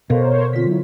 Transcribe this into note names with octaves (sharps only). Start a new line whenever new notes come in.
B2 A4 A#4 C5 C#5 F5
D3 C4 F4 B6
F#3 E4